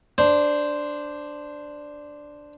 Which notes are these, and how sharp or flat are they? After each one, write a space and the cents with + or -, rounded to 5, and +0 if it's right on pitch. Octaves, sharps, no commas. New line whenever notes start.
D4 +0 C5 -5